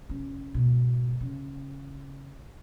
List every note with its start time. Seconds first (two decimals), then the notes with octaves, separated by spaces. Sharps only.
0.09 F1 C#4
0.54 G#2 B2
1.21 C#3